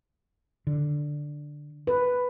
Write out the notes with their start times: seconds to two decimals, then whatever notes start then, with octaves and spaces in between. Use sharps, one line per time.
0.67 D3
1.87 B4